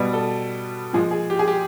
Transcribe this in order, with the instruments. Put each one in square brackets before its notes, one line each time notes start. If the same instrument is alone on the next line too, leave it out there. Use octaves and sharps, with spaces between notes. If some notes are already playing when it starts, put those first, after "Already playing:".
Already playing: [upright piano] B2 G3 B3
A4
A#2 F3 G#3 G#4
G#4
G4
G#4
G4